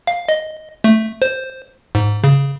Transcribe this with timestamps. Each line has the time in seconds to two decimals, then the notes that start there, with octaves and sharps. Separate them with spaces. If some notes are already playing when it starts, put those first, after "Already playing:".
0.07 F5
0.29 D#5
0.84 A3
1.22 C5
1.95 G#2
2.24 C#3